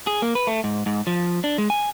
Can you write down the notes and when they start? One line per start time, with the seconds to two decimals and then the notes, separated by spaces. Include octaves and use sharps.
0.07 G#4
0.22 A#3
0.35 B4
0.47 A3
0.64 G#2
0.86 G#2
1.07 F3
1.44 D4
1.58 G#3
1.70 G#5